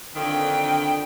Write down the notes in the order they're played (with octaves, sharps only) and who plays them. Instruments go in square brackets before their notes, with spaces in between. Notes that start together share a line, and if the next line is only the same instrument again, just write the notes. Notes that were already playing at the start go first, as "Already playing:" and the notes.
[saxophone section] F2 D#3 [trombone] D3 [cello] G5